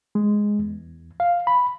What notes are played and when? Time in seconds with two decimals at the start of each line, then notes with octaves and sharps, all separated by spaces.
0.15 G#3
0.59 E2
1.20 F5
1.47 B5